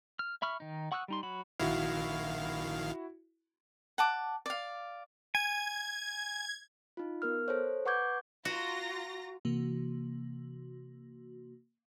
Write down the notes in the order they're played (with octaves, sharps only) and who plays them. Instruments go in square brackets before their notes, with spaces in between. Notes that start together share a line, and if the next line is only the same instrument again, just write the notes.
[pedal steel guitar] F6
E5 B5 C#6 F6
D#3 D#4
F#5 C#6 D#6 E6 F#6
G3 D#4 C6
F#3 F#4 B5
[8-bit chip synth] A#1 D#3 F5 [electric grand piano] E4 F#4
[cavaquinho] F#5 A5 D6
D5 F5
[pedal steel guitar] G#5 [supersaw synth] G#6
[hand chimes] D#4 F4
B3 A#4 F6
A4 C5 C#5
B4 F#5 C#6 D6 G6 G#6
[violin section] F4 A#5 A#6 [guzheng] F#4
[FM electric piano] C3 E3 A#3 F#4